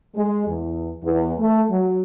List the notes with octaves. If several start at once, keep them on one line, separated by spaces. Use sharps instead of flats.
G#3
E2
E2
A3
F#3